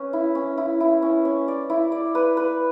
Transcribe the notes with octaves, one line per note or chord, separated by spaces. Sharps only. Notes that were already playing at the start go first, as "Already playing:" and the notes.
Already playing: C#4 B4
E4
C#4
E4
E4
C#4
C#4
D5
E4
D5
B4
B4